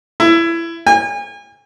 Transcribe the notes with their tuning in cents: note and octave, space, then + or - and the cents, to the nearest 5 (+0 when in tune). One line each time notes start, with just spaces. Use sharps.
E4 +20
G#5 -35